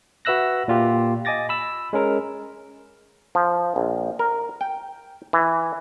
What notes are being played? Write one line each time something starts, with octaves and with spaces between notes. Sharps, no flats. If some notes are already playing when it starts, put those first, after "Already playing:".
F#4 B4 E5 E6 F#6 A#6
A#2 F4 G4
D#5 G#5 D6 A6 A#6
B5 E6
G#3 C#4 A#4
F3
A#1
A#4
G5
E3